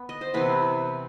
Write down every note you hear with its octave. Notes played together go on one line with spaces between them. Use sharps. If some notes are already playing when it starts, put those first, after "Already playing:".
Already playing: B3
D#5
C5
C3 E3 B3 B4